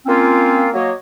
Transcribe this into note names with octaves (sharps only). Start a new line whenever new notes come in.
A#3 C4 C#4 F4
F#3 A#3 C#5 D#5